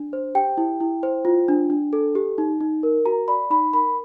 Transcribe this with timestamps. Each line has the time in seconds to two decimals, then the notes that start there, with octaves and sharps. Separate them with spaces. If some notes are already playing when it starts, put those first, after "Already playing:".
Already playing: D4
0.13 C5
0.35 G4 G5
0.57 E4
0.80 E4
1.03 C5
1.25 F4
1.48 D4
1.70 D4
1.93 A4
2.15 G4
2.38 D#4
2.61 D#4
2.83 A#4
3.06 F#4 A#5
3.28 D5 B5
3.51 D#4 B5
3.73 A#4 B5